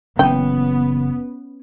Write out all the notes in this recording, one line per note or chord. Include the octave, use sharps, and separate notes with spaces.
F#1 E3 B3 C#4 G5